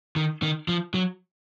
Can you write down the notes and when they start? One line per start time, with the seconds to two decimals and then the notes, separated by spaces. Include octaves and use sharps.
0.16 D#3
0.42 D#3
0.68 F3
0.94 F#3